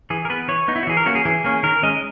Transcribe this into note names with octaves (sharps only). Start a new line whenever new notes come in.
E3 G#4
A#4
B3 B4
E3 C#5
B3 D#4
E4
F#4
E3 G#4
A#4
A#3 C#4 F#4
G#4
E3 G#4
A#3 C#4
D#3 A#4
G#3 C#4 D#5